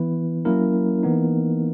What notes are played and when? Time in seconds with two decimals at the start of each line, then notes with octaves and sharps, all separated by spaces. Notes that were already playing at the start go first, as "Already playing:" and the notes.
Already playing: E3 B3 E4 B4
0.45 F#3 A#3 C#4 E4 A#4
1.03 E3 B3 D#4